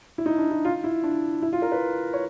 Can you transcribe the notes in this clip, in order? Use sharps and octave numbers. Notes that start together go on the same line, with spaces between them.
E4
D#4
D4
E4
F4
E4
D4
E4
F4
A#4
B4
C#5